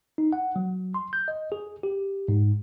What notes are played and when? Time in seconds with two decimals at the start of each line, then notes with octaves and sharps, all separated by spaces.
0.18 D#4
0.33 F#5
0.56 F#3
0.94 C6
1.13 G6
1.28 D#5
1.52 G#4
1.83 G4
2.28 G#2